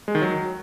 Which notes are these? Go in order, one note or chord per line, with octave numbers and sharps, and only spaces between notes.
G#3
D#3
F#3